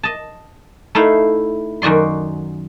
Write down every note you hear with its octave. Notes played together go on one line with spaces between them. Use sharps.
D#5 A5
A3 D#4 E4 F5
F#2 D#3 F#4 D5 C6